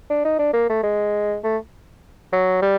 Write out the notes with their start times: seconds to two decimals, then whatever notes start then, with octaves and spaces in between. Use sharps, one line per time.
0.10 D4
0.24 D#4
0.39 D4
0.53 A#3
0.69 A3
0.83 G#3
1.43 A3
2.32 F#3
2.62 G3